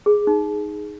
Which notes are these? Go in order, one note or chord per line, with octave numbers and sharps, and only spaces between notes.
G#4
D#4